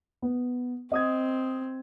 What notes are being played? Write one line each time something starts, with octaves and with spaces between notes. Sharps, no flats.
B3
C4 D#5 D#6 G#6